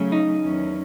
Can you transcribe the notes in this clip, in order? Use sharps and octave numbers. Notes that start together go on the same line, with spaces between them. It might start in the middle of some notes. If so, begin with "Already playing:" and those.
Already playing: C#3 F#3 A3 C#4
D#4
E2 D#3 F#3 C#4